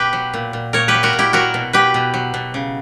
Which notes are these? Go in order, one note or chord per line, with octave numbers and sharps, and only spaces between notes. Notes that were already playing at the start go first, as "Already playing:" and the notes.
Already playing: B2 G4 B4
F#3
A#2
A#2
A#2 A#4 C#5
G4 B4
F#3
F#4 A#4
A#2
E4 G4
F#3 F#4 A#4
B2
B2 G4 B4
B2
F#3
B2
C#3